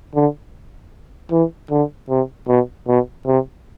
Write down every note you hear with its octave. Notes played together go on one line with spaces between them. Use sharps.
D3
E3
D3
C3
B2
B2
C3